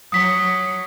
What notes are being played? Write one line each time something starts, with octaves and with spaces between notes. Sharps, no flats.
F#3 C#5 D#6 B6